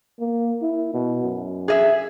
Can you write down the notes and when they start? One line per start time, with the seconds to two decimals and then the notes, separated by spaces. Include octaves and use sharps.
0.19 A#3
0.62 E4
0.94 B2
1.23 F#2
1.68 G#4 D#5 E5